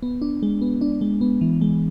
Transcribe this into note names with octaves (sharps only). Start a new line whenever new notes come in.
B3
D4
G#3
B3
D4
G#3
B3
E3
G#3